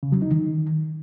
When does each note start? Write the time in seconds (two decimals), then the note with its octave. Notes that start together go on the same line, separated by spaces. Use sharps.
0.03 C#3
0.12 F#3
0.22 D#4
0.31 D#3